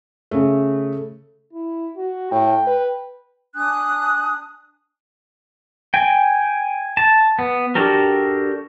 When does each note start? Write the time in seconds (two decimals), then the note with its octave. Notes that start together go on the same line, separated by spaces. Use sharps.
0.31 C#3 A3
1.53 E4
1.97 F#4
2.31 A2 G5
2.67 B4
3.54 D4 G#5 D#6 F#6
5.94 G5 G#5
6.97 A5
7.39 B3
7.75 D4 F#4 G4 A4 A#4